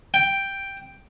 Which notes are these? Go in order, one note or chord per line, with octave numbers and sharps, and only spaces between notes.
G5